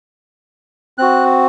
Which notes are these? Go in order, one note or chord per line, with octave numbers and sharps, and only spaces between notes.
C4 F#4 F#6